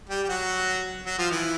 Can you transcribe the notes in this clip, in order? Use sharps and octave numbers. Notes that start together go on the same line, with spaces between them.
G3 G4
G4
F#3 F#4
F#3 F#4
F3 F4
E3 E4